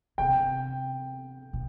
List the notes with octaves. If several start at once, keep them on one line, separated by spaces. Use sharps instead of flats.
C3 G5
B2